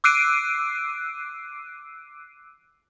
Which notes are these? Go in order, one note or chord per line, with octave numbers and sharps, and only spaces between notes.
D6 E6 F#6 C7 D7 D#7